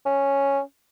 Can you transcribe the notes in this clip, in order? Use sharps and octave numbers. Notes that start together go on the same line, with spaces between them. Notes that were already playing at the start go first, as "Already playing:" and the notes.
C#4